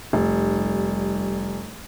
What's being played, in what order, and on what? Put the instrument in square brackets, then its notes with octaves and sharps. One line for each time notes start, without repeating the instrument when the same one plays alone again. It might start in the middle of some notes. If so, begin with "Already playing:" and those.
[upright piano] F1 [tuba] G3